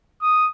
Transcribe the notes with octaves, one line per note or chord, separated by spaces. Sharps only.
D#6